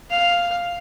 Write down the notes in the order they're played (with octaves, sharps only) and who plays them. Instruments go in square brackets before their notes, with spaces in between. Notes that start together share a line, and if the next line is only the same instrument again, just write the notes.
[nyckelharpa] F5